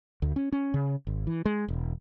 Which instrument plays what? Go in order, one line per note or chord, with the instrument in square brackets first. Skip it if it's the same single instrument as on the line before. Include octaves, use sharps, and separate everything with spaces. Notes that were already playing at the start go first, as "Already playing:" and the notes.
[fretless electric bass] D2
C#4
C#4
C#3
G#1
E3
G#3
E1